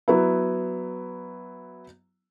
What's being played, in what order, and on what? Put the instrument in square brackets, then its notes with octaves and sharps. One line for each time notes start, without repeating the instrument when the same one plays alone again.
[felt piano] F#3 B3 E4